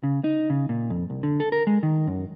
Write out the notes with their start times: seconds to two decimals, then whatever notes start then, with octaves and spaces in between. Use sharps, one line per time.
0.03 C#3
0.24 D#4
0.50 C#3
0.69 A#2
0.90 F2
1.10 C2
1.23 D3
1.40 A4
1.52 A#4
1.67 G#3
1.83 D#3
2.07 F#2